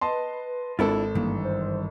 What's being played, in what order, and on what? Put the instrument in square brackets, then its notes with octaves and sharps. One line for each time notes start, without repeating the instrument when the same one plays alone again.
[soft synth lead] B4 [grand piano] D#5 A5 C6
[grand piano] G#1 A4 [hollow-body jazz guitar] D4 E4 F4
[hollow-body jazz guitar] G2 D#3 E3 [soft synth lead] A#3
[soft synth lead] C5